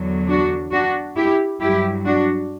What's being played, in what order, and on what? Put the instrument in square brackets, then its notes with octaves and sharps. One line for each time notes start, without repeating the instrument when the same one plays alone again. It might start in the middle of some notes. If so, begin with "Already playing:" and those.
Already playing: [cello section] E2 D3 F#3
D4 F#4
D4 F#4
E4 G4
G2 F#3 E4 G4
D4 F#4